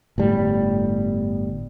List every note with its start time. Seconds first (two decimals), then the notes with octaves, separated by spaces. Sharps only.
0.18 G1 A2 G3